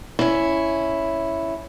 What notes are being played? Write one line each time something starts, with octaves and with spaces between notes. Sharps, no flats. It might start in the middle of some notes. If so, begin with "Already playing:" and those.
C#4 E4